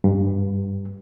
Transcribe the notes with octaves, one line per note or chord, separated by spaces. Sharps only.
G2